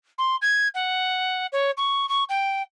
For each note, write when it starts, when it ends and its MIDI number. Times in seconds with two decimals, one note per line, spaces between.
0.18 0.36 84
0.41 0.68 92
0.74 1.47 78
1.52 1.71 73
1.77 2.08 85
2.09 2.24 85
2.29 2.62 79